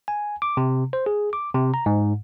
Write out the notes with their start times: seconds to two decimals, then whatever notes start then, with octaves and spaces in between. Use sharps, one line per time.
0.08 G#5
0.42 D6
0.57 C3
0.93 C5
1.06 G#4
1.33 D6
1.54 C3
1.74 A#5
1.86 G#2